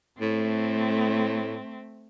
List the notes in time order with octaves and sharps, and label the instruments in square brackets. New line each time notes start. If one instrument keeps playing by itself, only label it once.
[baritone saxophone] A2 [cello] A3 C4